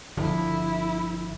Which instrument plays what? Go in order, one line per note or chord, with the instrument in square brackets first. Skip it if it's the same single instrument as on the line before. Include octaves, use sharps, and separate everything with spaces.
[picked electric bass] G1 D3 F3 [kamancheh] E4